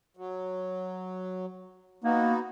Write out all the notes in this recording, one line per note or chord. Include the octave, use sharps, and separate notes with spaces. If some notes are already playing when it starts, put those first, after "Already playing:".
F#3
A#3 B3 D#4 F#4